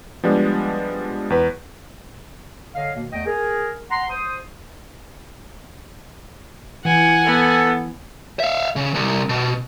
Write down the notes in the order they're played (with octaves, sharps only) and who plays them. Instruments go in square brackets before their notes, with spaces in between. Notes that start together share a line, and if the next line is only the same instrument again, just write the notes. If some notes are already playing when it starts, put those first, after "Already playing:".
[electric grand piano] F3 G3 G#3 B3 D4
E2 B4
[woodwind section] D3 C#5 D#5 F5
B2 D#3 A#3
E2 A3 D#5 G5
G#4 A#4
F#5 A#5 C6
C5 D#6
[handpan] E3 [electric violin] F#5 G#5
[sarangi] B3 [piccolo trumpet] A4
[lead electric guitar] E5 F5
C#3
C2
B2